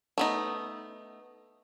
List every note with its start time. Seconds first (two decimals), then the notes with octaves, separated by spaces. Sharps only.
0.18 A3 B3 D#4